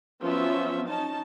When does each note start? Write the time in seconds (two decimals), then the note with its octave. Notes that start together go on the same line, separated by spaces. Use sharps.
0.23 F3 F#3 B3 C#4 E5
0.87 C#4 D#4 A5